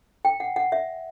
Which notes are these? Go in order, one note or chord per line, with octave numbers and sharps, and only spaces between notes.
G5
F#5
F#5
E5